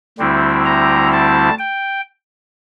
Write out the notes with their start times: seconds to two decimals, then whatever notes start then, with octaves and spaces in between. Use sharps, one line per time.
0.18 D2 D3 G3 C4 E4
0.65 A#5
1.13 A5
1.59 G5